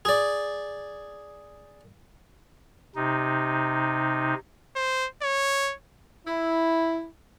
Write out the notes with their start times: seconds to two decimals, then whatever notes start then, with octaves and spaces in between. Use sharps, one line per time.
0.05 G#4 D5
2.96 C3 D#4
4.76 C5
5.22 C#5
6.27 E4